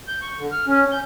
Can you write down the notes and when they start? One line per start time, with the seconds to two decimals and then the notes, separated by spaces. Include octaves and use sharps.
0.08 G6
0.22 C#6
0.39 D3
0.51 F6
0.67 C#4
0.91 G6